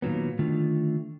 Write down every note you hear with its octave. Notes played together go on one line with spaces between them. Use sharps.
A#2 D#3 F#3 B3
D3 D#3 A3 F4